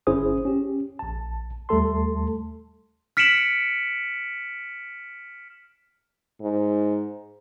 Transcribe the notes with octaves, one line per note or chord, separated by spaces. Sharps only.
G1 C#4 E4 G#4 C5 D#6
C#4 G4
A#1 A5
D#2 G3 A3 A4 A5 C6
F6 B6 C#7 D7 E7 F#7
G#2